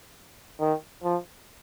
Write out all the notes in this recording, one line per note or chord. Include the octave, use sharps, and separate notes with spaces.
D#3
F3